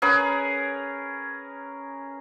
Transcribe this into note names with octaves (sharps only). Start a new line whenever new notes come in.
C#4 G#4 A#4 B4